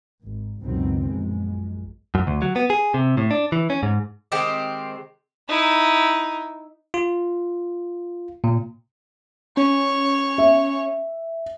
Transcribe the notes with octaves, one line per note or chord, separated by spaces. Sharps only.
G#1
C#2 F#2 B2 D#3 F#3 C4
A#1 F#2 G#3
F#2
D2
F#3
B3
G#4
C3
A2
D4
E3
C#4
G#2
D#3 G#3 C4 G4
D#4 E4
F4
A#2
C#4 C#5
E5